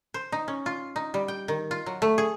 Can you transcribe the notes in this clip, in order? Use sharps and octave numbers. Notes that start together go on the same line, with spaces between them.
C5
D#4
C#4
F4
D#4
G3
G5
D#3
F4
F#3
A3
G#4